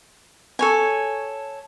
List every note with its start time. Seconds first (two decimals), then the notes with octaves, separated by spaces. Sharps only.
0.59 A4 C#5 G#5